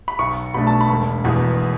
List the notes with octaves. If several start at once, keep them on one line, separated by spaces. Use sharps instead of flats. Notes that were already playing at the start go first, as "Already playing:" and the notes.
B5
B1 C#6
B2 A3 D4 B5
A5
B5
E1
E2 B2